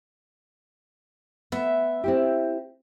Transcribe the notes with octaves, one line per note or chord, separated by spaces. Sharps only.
B3 E5
C4 E4 G4